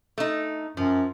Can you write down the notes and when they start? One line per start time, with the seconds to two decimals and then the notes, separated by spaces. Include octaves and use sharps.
0.18 A3 D#4
0.77 F#2 F3